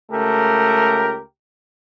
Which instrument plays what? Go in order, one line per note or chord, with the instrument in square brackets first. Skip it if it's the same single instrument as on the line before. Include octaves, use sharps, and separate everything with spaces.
[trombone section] C#2 A3 G4 A#4